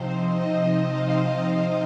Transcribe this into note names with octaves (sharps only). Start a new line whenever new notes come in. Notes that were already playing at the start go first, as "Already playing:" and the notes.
Already playing: C3 F3 C4 D#4 C5
D#5
D#5
F5